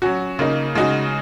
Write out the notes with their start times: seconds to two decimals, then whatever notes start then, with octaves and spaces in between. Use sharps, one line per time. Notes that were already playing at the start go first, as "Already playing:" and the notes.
0.02 F#3 C#4 F#4
0.39 C#3 A#3 D#4
0.75 C#3 G#3 D#4 F#4